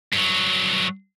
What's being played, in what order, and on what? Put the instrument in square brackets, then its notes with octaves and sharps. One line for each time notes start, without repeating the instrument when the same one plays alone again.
[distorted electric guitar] G2 F#3